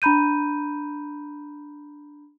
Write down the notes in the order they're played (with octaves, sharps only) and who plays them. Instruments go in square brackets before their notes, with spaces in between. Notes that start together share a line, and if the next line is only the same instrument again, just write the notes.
[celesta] D4 A#5 B5 G6 D#7